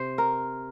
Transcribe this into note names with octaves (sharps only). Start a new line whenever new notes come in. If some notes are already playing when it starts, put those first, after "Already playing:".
Already playing: C3 C5
A#4